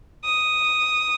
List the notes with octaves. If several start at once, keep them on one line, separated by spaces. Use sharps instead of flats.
D#6